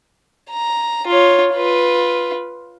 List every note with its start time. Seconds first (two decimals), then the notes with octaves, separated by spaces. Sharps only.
0.50 A#5
1.07 F4 C#5
1.52 F4 B4